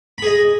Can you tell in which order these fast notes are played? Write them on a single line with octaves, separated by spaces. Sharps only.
B5 G#4 D#5